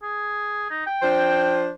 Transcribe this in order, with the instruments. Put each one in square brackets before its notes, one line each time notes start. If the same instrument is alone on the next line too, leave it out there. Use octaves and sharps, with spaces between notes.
[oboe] G#4
D#4
G5
[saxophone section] F3 D4 C5